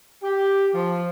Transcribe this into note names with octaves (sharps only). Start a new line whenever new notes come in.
G4
F3